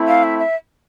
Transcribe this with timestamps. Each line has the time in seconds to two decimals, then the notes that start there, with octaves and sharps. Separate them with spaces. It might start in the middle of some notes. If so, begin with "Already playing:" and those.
Already playing: A3 C4 E4
0.08 F5
0.24 E5
0.39 E5